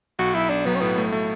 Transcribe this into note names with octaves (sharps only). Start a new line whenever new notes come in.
B1 F#4
B1 E4
B1 D4
F#3 B3
C#4
A2 B3
A3
A3